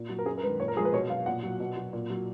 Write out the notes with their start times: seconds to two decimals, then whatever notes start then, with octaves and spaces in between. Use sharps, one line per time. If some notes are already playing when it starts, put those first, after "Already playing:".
Already playing: A#2
0.09 F#3
0.19 A#4
0.26 F#2 G#4
0.38 A#4
0.43 D#3 G#3 B4
0.59 A#2 C#5
0.68 A#4
0.76 F3 G#3 G#4
0.85 B4
0.93 B2 C#5
1.10 F#3 F5
1.26 A#2 F#5
1.43 F#3
1.60 B2
1.77 F#3
1.93 A#2
2.10 F#3